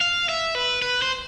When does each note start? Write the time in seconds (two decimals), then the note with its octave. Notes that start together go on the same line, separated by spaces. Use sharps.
0.01 F5
0.29 E5
0.55 B4
0.82 B4
1.02 C5